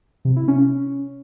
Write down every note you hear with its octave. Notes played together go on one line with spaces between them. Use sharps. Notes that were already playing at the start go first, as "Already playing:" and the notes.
C3
E4
C#4